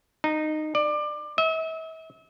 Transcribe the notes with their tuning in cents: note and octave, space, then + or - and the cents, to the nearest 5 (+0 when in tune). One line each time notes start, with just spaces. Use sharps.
D#4 -15
D5 +25
E5 -40